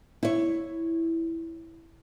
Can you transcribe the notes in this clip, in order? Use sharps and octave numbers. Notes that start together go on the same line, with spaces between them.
E4 C#5